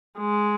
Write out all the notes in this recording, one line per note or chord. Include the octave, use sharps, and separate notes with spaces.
G#3